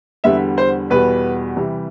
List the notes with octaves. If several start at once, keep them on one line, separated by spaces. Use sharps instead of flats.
E2 D3 G3 B3 E5
C5
E2 B2 G3 B3 B4
C3 E3 G3